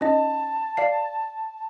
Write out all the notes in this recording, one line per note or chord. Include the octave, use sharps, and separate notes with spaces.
C#4 D#4 D#5 A5
D5 F5 C7